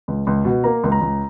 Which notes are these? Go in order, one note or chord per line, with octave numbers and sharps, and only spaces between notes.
C#2
C#2
B2
A#3 A#5
C#2
A#5
C#2